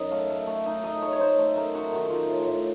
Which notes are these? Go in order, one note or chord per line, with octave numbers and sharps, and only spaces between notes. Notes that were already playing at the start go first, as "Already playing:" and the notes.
Already playing: F#2 D#4 D#5
A3 F5
A3
A3
D#4
A3 D#5
A3 C#5
C#5
D#4 C5
A3
A3 A#4
D#4 F#4
D#3 F#4
A3 F4
A2
A2